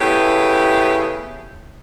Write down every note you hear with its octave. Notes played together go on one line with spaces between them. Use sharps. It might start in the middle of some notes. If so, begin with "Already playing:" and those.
C#3 A3 B3 E4 G4